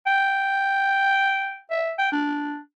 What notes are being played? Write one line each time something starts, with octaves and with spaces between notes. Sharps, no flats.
G5
E5
G5
D4